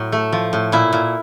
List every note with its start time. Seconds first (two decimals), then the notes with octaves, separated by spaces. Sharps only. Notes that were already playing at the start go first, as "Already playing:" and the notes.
Already playing: A2 F#3
0.12 A3
0.32 F3
0.53 A2
0.72 A#2 E4
0.93 A#2